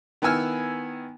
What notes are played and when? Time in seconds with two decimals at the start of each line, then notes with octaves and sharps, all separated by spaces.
0.22 D#3 B3 E4 G#5 E6 F6